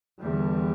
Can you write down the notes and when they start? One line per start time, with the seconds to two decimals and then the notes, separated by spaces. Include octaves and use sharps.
0.21 E2 D3 G3